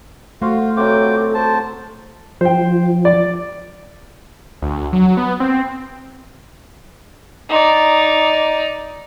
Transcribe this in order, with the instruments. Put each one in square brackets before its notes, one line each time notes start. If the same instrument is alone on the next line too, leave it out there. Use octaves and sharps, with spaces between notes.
[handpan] A3 [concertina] F4 F5 [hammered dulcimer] F#4 C5
[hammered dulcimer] C3 F#3 [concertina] F4 G5 D6 [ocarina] A4
[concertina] C5 A5
[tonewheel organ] F3 [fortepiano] C5 G5
[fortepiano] D5
[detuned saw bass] D2
F#3
B3
C4
[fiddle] D#4 D5